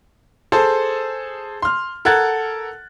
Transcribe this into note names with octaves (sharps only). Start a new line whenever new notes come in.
G#4 A4 C5 A5
C6 F6
A4 A#4 F#5 F#6 G#6 A6